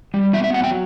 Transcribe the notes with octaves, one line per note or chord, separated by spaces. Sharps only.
G3
B3 E5
E5
F#3 F#5
G5